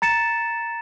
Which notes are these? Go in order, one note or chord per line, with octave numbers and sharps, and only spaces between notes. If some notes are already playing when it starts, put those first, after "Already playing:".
A#5 A6 C#7 E7